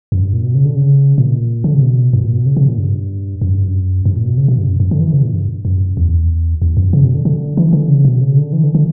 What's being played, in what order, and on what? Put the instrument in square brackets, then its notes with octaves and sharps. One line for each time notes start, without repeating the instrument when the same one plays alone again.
[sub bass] F#2
G2
A#2
B2
C#3
D3
C#3
A#2
D3
C#3
B2
G2
A#2
B2
C#3
C#3
A#2
G2
F#2
G2
F#2
G2
A#2
B2
C#3
B2
G2
F#2
F#2
D3
E3
C#3
A#2
G2
F#2
E2
E2
F#2
C#3
B2
D3
D3
E3
D3
C#3
B2
C#3
D3
E3
D3
D3